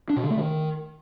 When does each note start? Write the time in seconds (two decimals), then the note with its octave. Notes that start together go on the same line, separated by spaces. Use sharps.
0.09 D4
0.16 B2
0.23 D3
0.30 A3
0.37 D#3